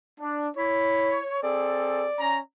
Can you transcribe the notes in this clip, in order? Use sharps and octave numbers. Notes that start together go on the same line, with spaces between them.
D4
E4 C#5
C4 G#4 A4 D5
C#4 A#5